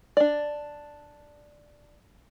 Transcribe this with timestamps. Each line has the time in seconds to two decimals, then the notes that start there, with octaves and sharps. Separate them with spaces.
0.17 D4 D5